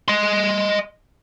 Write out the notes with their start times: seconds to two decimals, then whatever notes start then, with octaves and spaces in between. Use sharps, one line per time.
0.08 D#5 C6